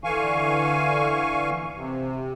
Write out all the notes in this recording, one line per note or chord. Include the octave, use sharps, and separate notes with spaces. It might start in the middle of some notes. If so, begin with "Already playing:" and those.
D3 E3 F5 G#5 C#6
C3